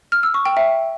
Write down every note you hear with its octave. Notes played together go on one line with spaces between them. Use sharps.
F6
E6
C#6
G5
E5